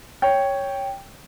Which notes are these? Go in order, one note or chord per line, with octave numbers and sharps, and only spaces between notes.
C#5 G5